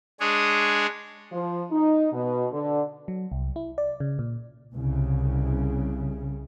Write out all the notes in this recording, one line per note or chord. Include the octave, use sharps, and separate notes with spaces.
G#3 D4 G#4 C#5
F3
D#4
B2
D3
F#3
C2
E4
D5
C#3
A#2
C2 C#3